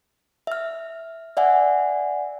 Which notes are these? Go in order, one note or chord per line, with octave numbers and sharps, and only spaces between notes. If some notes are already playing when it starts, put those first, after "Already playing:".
E5 F6
D5 E5 F#5 G#5